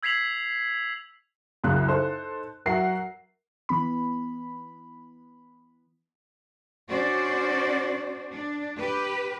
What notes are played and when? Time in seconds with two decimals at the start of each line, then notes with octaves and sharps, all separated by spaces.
0.03 E6 G#6 B6 C7 F7 F#7
1.64 C2 F#2 C#3 F#6
1.88 D#4 A4 C5
2.66 F#3 F#4 A#4 E5 F#5 C7
3.69 E3 B3 B5
6.89 C#4 D4 F#4 C5 D5
8.32 D4
8.79 G4 B4